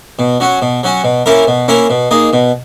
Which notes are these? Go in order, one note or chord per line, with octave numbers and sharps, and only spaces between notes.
B2
F#3 C#4 F#4
B2
F#3 C#4 F#4
B2
A#3 C#4 E4 A#4
B2
A#3 C#4 E4 A#4
B2
A#3 D#4 G#4
B2